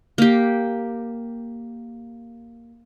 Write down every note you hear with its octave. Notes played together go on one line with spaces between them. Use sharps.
A#3 G4